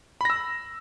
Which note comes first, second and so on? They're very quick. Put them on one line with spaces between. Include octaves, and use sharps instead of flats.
B5 A#6 E6